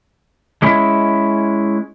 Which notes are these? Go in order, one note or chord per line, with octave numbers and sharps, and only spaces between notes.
G#3 C#4 E4